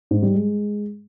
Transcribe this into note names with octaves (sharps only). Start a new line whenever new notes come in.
G#2
G3
G#3